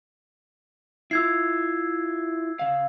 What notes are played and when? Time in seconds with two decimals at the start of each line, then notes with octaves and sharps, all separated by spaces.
1.11 E4 F4 E6 G#6 C7
2.59 C#3 F5